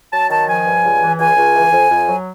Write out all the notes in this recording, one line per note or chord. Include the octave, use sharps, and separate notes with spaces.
F#3 A5
D#3 A5
F3 G#5
G2
C#2
E3
C#2 G#5
C#2
E3
F2
F2
F#3